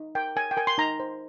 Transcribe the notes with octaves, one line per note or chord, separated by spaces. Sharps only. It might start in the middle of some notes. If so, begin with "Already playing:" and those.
Already playing: D#4
A#4 G5
A#4 G#5
G5
A#4 G#5
C6
D#4 A#5
C5